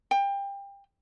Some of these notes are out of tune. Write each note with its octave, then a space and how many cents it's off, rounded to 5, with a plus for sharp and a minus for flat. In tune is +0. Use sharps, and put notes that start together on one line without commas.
G5 +25